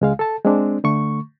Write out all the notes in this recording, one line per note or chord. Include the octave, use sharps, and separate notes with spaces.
C#2 G#3 F5
A4 A5
G#3 C4 D4
D3 A3 C#6